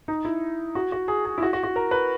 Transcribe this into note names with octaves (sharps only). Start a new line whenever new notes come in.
D#4
E4
F#4
F#4
G#4
G#4
E4
F#4
F#4
F#4
A#4
B4